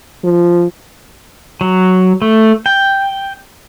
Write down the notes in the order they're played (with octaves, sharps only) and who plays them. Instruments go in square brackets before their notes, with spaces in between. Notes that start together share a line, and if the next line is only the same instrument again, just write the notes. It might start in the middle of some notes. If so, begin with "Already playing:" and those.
[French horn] F3
[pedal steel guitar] F#3
A3
G5